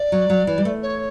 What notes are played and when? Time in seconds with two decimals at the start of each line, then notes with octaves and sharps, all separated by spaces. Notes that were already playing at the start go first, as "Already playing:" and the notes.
Already playing: D5
0.12 F#3
0.30 F#3
0.47 E3
0.58 G3
0.65 A3
0.82 C#5